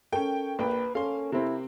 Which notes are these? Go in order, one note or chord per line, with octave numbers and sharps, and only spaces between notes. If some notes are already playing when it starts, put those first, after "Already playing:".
C#4 A4 A#4 G5
A#1 A#3 B4 G5
C#4 A4 F5 C6
C3 C4 E4